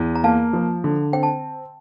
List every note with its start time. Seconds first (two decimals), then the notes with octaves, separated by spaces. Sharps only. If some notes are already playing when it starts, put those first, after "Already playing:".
Already playing: E2
0.16 A#5
0.24 A#3 F5 A5
0.53 F3
0.84 D3
1.13 C4 G5
1.23 A5